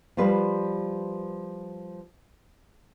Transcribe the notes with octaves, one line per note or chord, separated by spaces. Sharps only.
F3 G3 F4 B4